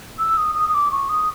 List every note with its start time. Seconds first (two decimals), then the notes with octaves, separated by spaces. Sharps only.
0.19 E6
0.37 D#6
0.55 D#6
0.69 D#6
0.74 D6
0.92 C#6
1.09 D#6